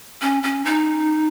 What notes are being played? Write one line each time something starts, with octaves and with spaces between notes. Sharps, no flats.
C#4
C#4
D#4